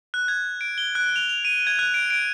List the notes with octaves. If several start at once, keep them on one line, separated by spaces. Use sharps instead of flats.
F#6
G#6
D7
G7
F#6
F7
F7
D#7
G#6
F#6
D7
D7